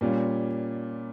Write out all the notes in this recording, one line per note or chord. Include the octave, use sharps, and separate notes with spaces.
A#2 G3 C#4 F4